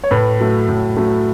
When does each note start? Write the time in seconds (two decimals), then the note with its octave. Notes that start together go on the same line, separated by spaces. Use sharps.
0.04 C#5
0.11 A2 B4
0.40 F#3 A3
0.69 A2
0.97 F#3 A3